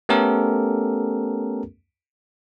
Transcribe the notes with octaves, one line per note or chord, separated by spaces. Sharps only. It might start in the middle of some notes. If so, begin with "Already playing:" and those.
A3 B3 C#4 G4 A4 A#4